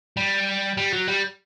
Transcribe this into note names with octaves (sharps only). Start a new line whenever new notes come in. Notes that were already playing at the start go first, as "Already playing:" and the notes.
G3
G3
F#3
G3